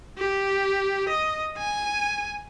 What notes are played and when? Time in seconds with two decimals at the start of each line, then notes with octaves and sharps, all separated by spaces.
0.18 G4
1.09 D#5
1.58 G#5